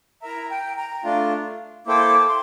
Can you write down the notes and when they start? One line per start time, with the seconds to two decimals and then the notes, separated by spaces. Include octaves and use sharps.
0.22 E4 A#4 E5 A#5
0.50 G5
0.77 A#5
1.04 A3 D4 F4
1.87 A#3 E4 A4 C5 G5 D6
2.27 C6